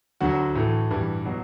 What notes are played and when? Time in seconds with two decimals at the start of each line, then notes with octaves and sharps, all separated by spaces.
0.21 D2 D3 F#3 F#4
0.55 A2 E3 A3
0.91 G2 E3 G3
1.25 B2 F#3